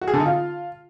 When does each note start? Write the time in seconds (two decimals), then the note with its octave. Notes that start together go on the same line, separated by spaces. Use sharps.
0.01 F#4
0.08 G#4
0.14 D3
0.20 D#4
0.26 F4